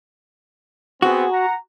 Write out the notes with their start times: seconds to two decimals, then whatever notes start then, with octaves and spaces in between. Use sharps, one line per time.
1.02 B3 C4 F#4 G#4
1.32 F#5 A#5